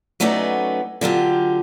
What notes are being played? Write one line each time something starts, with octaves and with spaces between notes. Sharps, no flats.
F#3 A3 B3 C#4 D#4 D5
D3 F#3 F4 G4